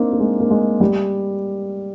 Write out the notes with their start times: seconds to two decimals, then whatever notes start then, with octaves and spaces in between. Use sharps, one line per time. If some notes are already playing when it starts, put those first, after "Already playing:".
Already playing: A#3 C4 D4 D#4
0.12 A#3
0.20 G#3
0.40 A#3
0.50 G#3
0.80 G3